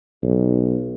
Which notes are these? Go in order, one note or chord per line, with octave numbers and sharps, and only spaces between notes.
B1